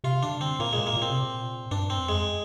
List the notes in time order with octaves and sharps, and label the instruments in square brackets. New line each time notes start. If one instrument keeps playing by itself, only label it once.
[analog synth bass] C3 [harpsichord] F4
[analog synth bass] D3 [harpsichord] D4
[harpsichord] C4
[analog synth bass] A#2 [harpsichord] A#3
[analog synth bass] A#2 [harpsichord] G#3
[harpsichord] A#3
[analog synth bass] A#2
[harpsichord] C4
[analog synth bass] C3
A#2
[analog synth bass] G2 [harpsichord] D4
[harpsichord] C4
[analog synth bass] F2
[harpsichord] G#3